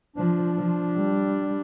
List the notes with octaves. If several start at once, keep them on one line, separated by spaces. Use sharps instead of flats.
F3 D4
F3
G3